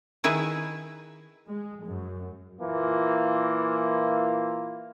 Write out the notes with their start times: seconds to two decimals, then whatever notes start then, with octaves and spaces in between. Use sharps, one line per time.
0.24 D#3 E4 G#4 B4 G#5
1.47 G#3
1.84 F#2
2.60 A#2 E3 A#3 F4